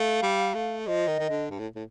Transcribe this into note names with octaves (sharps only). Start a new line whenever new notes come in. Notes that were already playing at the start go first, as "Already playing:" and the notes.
Already playing: A3 F5
G3
A3
F3 D#5
D#3
D#3
D3
G2
A2
A2